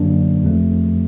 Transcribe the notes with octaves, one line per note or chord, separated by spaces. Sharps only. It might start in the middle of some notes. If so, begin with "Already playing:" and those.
Already playing: F#2 D3 F#3 A#3 D4
F2 C#3 F3 A3